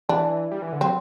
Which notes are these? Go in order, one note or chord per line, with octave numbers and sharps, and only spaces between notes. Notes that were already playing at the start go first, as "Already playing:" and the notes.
E3 D4
G3
E3
D3
F#3 C4